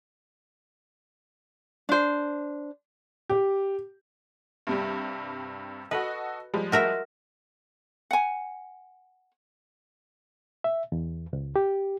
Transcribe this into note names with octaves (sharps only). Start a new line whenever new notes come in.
D4 C5
G4
G2 C3 G3
F#4 A4 B4 D#5
F3 G3 G#3
F#4 A#4 E5
F#5 G#5
E5
E2
C#2
G4